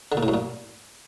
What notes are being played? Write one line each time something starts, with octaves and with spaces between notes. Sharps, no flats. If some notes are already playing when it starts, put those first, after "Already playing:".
D3
A#2
A2
F#2
A#2